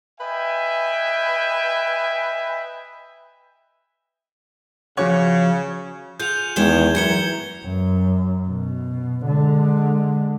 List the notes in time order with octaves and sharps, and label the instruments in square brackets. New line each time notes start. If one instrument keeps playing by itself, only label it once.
[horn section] B4 D#5 E5 G5 G#5
[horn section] C#3 [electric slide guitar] F3 F#4 F#5 [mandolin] C#5
[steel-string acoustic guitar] F4 G#4 F#5 [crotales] G6 F7
[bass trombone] E2 [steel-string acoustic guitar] D#3 G#3 C#4 [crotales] G#6 E7 G7
[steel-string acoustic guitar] F#2 F#3 A#4 [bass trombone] E3 [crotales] G#6 C#7 G7
[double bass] F#2
B2
D3 G#3